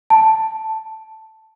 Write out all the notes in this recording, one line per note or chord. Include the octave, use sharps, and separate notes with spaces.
A5